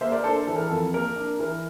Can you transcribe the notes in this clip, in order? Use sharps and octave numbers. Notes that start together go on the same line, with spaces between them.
A#3 C5 E5
A#4 D5
D4 A4 C5
E3 A4
A#4
F2 A4
A#3 A#4
D4
E3 A#4